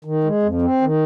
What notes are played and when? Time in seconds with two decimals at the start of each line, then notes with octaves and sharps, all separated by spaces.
0.05 D#3
0.24 G#3
0.43 F2
0.62 C4
0.81 D#3